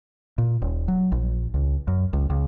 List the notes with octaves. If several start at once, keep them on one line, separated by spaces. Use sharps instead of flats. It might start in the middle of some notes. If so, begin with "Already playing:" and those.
A#2
D#1
F#3
A#1
C#2
F#2
C#2
C#2